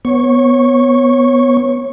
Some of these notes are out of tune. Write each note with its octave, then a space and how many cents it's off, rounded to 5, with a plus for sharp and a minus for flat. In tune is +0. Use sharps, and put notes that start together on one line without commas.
B3 +0 C#5 -20 C#6 -10